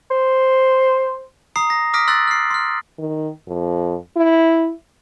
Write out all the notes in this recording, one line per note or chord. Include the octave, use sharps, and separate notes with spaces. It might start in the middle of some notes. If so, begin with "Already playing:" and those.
C5
A#5 D#6 C7
A#6
D6 D#6 F6 A#6 B6 D7
C6 E6 F#6 A6 F#7
F6 C7
C6 F6
D#3
F2
E4